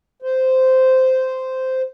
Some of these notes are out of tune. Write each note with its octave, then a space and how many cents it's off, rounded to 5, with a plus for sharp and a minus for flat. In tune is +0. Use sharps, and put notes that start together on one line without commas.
C5 -10